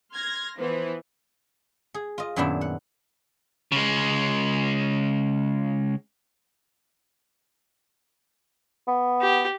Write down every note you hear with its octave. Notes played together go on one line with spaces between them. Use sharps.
C6 F6 G#6 A#6
E3 F3 B3 C5
G#4
F4 D#5
F#2 A#2 D#3 B3 D4 E4
F#5
C#3 G#3
B3
G4